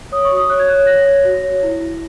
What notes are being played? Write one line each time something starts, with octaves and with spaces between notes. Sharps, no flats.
C#5 D#6
C#6
F#4
D#6
C#5 F#6
G#6
C#5 F#6
C#5 A#6
C#5
F#4
C#5
E4
E4